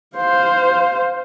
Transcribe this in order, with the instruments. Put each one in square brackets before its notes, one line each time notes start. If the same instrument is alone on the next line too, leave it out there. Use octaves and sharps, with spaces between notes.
[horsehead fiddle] C5 F5